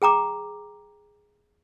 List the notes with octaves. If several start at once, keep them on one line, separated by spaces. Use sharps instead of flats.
G#4 G5 A#5 D6